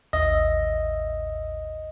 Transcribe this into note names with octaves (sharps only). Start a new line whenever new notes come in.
A1 D#2 D#5 E5